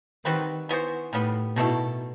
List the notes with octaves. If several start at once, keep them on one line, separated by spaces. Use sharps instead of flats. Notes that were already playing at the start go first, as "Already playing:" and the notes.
D#3 G3 C4 F#4 B4
E3 B3 F#4 C5
A2 D#3 G3 B3
B2 D#3 A3 E4 A4